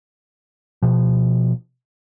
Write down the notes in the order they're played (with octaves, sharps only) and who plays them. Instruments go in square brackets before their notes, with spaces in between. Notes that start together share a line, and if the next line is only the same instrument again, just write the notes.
[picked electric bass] B2 F3